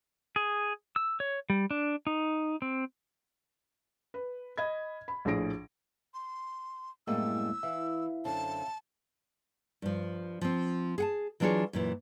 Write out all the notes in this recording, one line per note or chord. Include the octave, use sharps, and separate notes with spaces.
G#4
E6
C#5
G3
D4
D#4
C4
B4
D#5 B5 G#6
B5
A#1 A2 G#4 A#6 D7
C6
F#2 A2 G3 G#3 A#3 B3 E6
E3 E5 F5
F#2 D3 C4 A5
G2 F3
F3 C4
G#4 F#5 A5
E3 F#3 D4 F4 G#4 C#5
F#2 A#2 E3